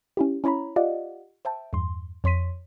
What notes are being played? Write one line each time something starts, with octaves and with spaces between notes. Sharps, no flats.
C#4 E4 G4
C#4 E4 C#5 A#5 B5
F4 G4 D5 D#5 F5 F#5
C5 E5 G5 A5
E2 G2 C6
F2 C#5 C6 B6 D#7